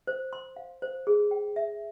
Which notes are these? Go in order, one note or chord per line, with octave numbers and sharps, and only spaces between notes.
C5
C6
F5
C5
G#4
G5
E5